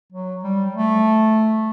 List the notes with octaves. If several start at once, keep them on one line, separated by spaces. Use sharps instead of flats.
F#3
G3
A3